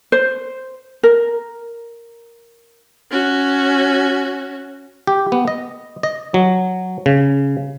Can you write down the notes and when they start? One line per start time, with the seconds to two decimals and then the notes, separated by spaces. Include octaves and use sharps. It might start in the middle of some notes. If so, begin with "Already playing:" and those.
0.12 C5
1.03 A#4
3.11 C#4 F#4
5.07 G4
5.32 B3
5.48 D#5
6.03 D#5
6.34 F#3
7.06 C#3